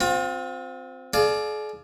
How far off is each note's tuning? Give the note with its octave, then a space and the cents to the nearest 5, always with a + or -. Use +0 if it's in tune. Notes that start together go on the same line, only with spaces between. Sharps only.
C4 -10 F4 +35
G#4 +45 D5 +15 F5 +0